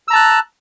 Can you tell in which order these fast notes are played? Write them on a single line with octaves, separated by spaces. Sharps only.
E6 A#5 A5 F#6